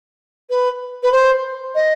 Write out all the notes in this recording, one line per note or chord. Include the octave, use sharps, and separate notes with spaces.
B4
B4
C5
D#5